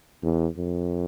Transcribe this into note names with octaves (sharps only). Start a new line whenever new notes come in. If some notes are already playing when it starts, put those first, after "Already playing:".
E2
F2